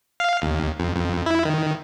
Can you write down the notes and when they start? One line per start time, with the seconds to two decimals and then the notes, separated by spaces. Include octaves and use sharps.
0.20 F5
0.42 D#2
0.80 F2
0.96 F2
1.26 E4
1.45 D#3